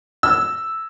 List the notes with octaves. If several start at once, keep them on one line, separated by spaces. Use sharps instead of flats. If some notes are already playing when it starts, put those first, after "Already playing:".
E6